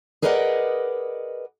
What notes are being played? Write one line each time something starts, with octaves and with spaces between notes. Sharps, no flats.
G#4 A#4 B4 D5 D#5 F#5